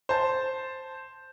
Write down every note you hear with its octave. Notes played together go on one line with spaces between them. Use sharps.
C5 A5